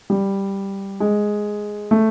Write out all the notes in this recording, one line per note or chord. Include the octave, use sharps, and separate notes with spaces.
G3
G#3
A3